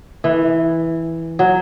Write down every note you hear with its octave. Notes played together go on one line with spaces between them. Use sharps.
E3
F#3